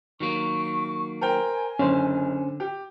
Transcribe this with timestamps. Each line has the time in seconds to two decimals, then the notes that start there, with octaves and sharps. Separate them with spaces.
0.20 D#3 F#3 A#3 C#6
1.21 A#4 C5 G5 G#5
1.79 F#1 D3 C#4 C5
2.60 G4